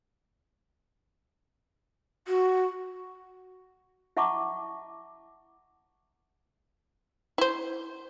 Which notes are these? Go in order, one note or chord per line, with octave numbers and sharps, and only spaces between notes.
F#4
E4 E5 F#5 A5 C#6 D6
E4 C5